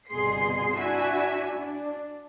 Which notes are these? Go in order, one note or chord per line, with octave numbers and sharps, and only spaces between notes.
G1 C2 B2 G#4 C6 C7
D4 E4 F#4 E5 G#5
D4